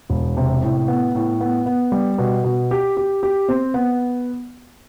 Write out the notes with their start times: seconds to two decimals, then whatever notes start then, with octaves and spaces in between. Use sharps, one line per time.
0.10 E1
0.37 C3
0.63 A2
0.88 B3
1.15 A2
1.41 B3
1.66 B3
1.92 G3
2.18 B2
2.44 B2
2.71 G4
2.97 G4
3.23 G4
3.49 C4
3.74 B3